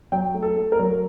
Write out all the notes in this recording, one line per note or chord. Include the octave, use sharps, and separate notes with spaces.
F#3 G5
A3
A4
A3
A#4
F#3